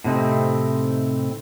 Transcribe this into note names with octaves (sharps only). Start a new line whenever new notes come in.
A2 C3 C4 D#4